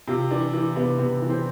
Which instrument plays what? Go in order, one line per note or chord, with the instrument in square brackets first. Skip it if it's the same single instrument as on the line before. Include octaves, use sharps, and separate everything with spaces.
[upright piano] C3 F4
E3 D4
E3
C3 B3
C3 B3
E3
C4